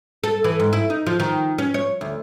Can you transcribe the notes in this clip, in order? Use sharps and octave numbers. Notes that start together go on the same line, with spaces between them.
A4
E3
G#2
E4
D#4
F3
D#3
C#4
C#5
D2